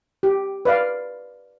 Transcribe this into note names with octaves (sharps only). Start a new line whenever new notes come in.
G4
B4 D5 F5